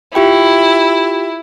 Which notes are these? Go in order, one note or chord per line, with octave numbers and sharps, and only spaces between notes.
E4 F4 G4 G5